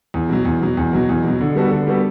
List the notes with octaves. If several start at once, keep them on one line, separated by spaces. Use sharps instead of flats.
E2
B2 F#3
E2
B2 F#3
E2
B2 F#3
E2
B2 F#3
D3
G3 B3 F#4 A4
D3
G3 B3 F#4 A4